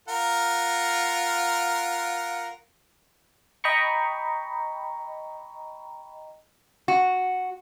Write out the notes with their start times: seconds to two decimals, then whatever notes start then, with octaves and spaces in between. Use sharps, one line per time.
0.08 F4 A#4 F#5
3.64 D#5 G5 A#5 B5 C#6
6.88 F#4